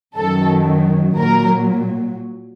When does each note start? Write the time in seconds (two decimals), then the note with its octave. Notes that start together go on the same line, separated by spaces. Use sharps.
0.16 F#2 D#3 F#3 A4
1.17 A#2 F#3 A#4